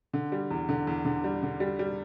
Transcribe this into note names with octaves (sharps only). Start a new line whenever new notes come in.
D3
G3
E2
D3
E2
D3
G3
D3
G3
G3